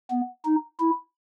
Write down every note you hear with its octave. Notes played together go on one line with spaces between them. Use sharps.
B3
D#4
E4